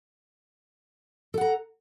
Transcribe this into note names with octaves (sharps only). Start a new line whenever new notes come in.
A4 F#5 A#5